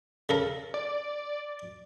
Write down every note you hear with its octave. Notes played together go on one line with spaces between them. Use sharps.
C#3 A4 A#4
D5